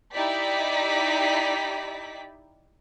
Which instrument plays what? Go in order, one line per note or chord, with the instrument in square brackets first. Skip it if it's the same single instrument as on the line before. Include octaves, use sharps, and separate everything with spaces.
[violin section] D#4 E4 G4 D5 B6